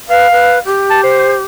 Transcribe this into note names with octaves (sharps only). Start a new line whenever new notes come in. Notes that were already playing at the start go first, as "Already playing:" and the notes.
B4 F5
B4
G4
A5
C5